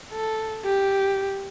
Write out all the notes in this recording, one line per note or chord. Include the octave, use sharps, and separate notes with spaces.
A4
G4